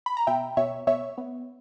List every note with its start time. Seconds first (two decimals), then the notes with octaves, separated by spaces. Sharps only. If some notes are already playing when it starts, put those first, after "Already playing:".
0.06 B5
0.17 A#5
0.27 B2 E5 G5
0.57 B2 C#5 E5
0.87 B2 C#5 E5
1.18 B3